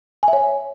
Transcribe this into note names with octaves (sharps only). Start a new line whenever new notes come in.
G#5
E5
C#5